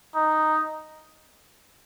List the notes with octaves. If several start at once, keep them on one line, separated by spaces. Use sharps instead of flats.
D#4